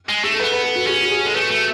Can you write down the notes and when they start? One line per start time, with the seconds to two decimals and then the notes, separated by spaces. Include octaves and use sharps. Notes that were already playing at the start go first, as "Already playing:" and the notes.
0.09 G#3
0.24 A3 G#4
0.32 A4
0.40 B3 B4
0.52 B4
0.64 A4
0.76 F#4
0.87 C#4 G#4
1.03 F#4
1.11 G#4
1.23 G#3 A4
1.34 A3 B4
1.51 A3